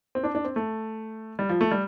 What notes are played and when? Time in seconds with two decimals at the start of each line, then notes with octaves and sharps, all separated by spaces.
0.15 C4
0.23 D4
0.35 D4
0.45 C4
0.56 A3
1.39 G3
1.49 F3
1.61 A3
1.71 G3